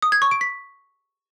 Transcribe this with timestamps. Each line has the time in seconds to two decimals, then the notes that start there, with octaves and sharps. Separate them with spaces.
0.02 D#6
0.12 G#6
0.22 C#6
0.31 D7
0.41 B6